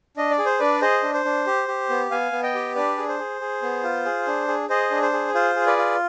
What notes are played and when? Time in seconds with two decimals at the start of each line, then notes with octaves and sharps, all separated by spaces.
0.17 D4 D#5
0.31 D5
0.39 G#4
0.45 C5
0.59 D4 B4 D5
0.81 G#4 C5 D#5
1.03 D4
1.14 C5
1.25 D4
1.47 G4
1.68 G4
1.89 B3
2.11 B3 F5 G#5
2.32 B3
2.43 D#5 G5
2.54 G4
2.75 D4 B4 D5
2.97 G#4
3.09 C5
3.19 G#4
3.41 G#4
3.62 B3
3.83 F4
4.05 G#4
4.27 D4
4.48 G#4
4.69 G#4 C5 D#5
4.91 D4
5.02 C5
5.13 G#4
5.34 F4 C5
5.56 G#4
5.67 B4 D5
5.77 F4